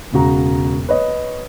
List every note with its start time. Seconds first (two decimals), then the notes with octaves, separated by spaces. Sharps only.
0.13 E1 C#3 F#4 A#5
0.89 B4 C#5 D#5